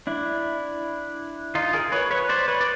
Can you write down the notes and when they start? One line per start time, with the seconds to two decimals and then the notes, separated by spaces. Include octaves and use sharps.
0.07 D4 E4
1.55 D#4 F4
1.73 G#4 A#4
1.92 B4 C#5
2.11 B4 C#5
2.29 C5 D5
2.48 B4 C#5
2.61 D5